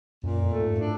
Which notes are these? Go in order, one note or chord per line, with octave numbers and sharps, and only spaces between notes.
F#2 A#2
F2
A3
G#2
A2 D4